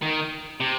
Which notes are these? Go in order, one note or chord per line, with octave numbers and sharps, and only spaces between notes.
D#3
C3